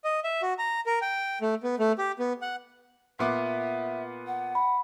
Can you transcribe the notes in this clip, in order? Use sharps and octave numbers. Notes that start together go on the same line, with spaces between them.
D#5
E5
F#4
A#5
A#4
G5
A3
B3
A3
G4
B3
F#5
A#2 B3 E5 D6
F#5
B5